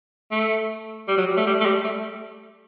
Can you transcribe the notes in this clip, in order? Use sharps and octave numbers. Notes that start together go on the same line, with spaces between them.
A3
G3
F#3
G3
A3
G3
A3
G3
A3